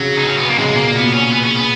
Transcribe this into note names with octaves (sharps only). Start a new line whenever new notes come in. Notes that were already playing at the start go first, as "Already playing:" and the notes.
Already playing: C#3 F#3
D#4
C#4
B3
A#3
C#3 G#3
B2 A#3
A#2
B2 B3
C#4
B3
C#4
B3